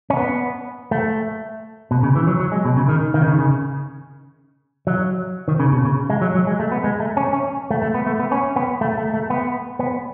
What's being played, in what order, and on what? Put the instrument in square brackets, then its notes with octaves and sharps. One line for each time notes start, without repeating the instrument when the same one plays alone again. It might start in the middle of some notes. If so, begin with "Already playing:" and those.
[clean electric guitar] C#4
B3
A3
B2
C#3
E3
F#3
F#3
G#3
B2
C#3
D#3
D#3
C#3
D#3
C#3
F#3
D#3
C#3
B2
C#3
G#3
F#3
F#3
G#3
A3
B3
G#3
A3
C#4
C#4
A3
A3
B3
A3
B3
C#4
B3
A3
A3
A3
B3
B3